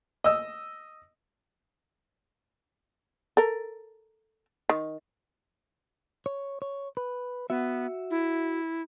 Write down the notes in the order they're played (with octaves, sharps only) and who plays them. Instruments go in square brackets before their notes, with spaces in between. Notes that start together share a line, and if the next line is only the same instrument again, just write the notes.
[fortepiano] D#5 E6
[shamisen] A4 A#4
D#3
[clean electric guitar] C#5
C#5
B4
[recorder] B3 [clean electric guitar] F#4 E5
[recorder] E4